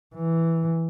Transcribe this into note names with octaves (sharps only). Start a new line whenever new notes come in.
E3